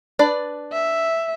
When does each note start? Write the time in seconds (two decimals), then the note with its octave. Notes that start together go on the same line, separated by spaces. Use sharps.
0.19 D4 B4 D5
0.72 E5